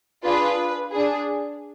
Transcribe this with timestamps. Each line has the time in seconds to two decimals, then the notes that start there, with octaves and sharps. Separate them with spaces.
0.24 D4 F4 G#4 B4
0.93 D4 G#4